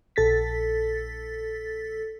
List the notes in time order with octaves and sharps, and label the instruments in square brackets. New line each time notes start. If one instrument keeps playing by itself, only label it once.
[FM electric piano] A#1 A4 A6 B6